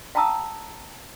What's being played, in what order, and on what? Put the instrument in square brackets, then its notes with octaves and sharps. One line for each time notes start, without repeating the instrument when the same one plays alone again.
[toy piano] F5 G5 A5 A#5 D#6 E6